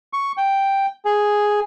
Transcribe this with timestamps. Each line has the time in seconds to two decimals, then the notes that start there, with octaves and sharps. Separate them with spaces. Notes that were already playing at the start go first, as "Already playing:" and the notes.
0.13 C#6
0.37 G5
1.05 G#4